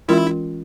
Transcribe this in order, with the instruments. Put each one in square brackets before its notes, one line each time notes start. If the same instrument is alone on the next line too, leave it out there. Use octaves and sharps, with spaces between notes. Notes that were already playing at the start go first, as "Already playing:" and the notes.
[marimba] E3 G#3 C#4 F4 A#4 [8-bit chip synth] E4